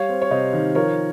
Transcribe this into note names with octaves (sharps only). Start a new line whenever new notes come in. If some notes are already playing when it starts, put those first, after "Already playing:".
Already playing: G3 C#5 F5
C4
C#5
C3 C5 D#5
D#3
F3 A#4 C#5